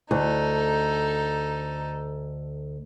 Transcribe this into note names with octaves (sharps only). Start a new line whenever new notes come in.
D2 D#4 A4